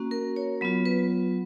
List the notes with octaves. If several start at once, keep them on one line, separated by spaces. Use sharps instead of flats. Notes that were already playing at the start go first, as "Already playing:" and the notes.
Already playing: A#3 C#4 F#4
A#4
C#5
F#3 B3 F4
B4